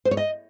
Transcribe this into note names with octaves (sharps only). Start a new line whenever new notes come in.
C5
C#5
D#5